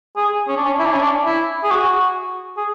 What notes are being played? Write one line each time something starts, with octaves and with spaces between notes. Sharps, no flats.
G#4
C#4
D4
C#4
E4
D4
C#4
D4
E4
G#4
F#4
G#4